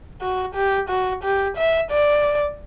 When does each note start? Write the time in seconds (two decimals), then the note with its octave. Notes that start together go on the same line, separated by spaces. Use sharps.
0.22 F#4
0.55 G4
0.89 F#4
1.24 G4
1.57 E5
1.91 D5